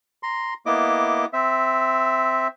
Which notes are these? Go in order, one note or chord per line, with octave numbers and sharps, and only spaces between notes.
A#5 C6
A#3 B3 E4 D#5 D6
C4 E5